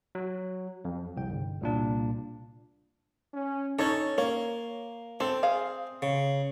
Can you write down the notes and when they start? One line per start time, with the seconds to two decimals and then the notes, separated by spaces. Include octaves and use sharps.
0.15 F#3
0.85 F2
1.17 C2 G5
1.30 G1
1.61 C2 A#2 D4
3.34 C#4
3.79 C#4 D#4 A4 C#5
4.18 A#3 C#5
5.20 C4 A4
5.43 G#4 F5
6.02 C#3